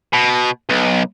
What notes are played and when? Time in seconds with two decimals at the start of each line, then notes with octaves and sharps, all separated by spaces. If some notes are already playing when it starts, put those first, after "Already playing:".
0.13 B2
0.69 B1